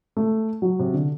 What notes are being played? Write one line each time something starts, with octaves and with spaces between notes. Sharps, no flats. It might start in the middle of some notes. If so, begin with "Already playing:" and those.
A3
F#3
C3
D3